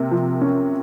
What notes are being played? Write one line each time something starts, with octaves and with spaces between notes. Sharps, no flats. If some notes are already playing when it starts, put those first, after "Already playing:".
Already playing: C3 A#3
F3
C#4